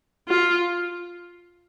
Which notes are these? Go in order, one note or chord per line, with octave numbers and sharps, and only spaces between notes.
F4